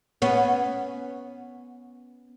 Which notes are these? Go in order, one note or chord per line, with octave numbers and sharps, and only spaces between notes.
B3 C#4